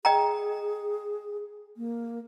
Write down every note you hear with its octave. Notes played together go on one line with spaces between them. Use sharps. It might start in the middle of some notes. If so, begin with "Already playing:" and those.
G#4 D#5 G5 A#5
A#3